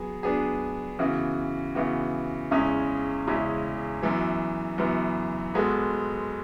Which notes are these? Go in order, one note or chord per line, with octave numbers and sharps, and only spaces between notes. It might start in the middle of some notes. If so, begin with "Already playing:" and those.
Already playing: F#3 B3 G#4
F#3 B3 D4 G#4
C#3 E3 B3 F#4
C#3 E3 B3 F#4
E2 C#3 G#3 C#4 E4
E2 C#3 G#3 C#4 E4
F#2 E3 B3
F#2 E3 B3
G#2 G#3 B3 F#4 A4